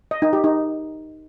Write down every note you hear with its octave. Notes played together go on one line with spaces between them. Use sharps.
D#5
D#4
G4
D#4